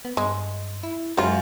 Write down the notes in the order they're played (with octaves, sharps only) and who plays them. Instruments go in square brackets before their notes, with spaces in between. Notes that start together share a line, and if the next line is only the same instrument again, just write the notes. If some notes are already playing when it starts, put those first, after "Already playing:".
[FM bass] B3
[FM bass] G2 [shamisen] G#3
[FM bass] E4
[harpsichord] F#2 [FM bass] G#3 [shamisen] C#4 F4